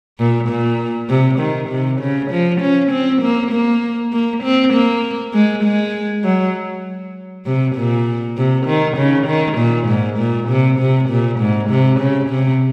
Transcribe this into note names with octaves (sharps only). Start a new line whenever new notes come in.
A#2
A#2
C3
D#3
C3
C#3
F3
C#4
C4
A#3
A#3
A#3
C4
A#3
G#3
G#3
F#3
C3
A#2
C3
D#3
C#3
D#3
A#2
G#2
A#2
C3
C3
A#2
G#2
C3
C#3
C3